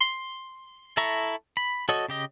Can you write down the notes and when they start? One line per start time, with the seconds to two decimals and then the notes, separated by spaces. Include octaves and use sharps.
0.01 C6
0.97 E4 A4 E5 A#5 C#6
1.57 B5
1.89 F#4 A4 C#5 D#5
2.08 C#3 G4 D#5